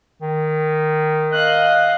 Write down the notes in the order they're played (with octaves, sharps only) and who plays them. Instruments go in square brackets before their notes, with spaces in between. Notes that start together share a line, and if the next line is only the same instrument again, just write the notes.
[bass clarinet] D#3
[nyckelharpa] D#5 F5 [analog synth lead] F#6